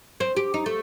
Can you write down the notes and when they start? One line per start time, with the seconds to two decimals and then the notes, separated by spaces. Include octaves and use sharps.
0.20 C4
0.37 G4
0.54 D#4
0.66 A3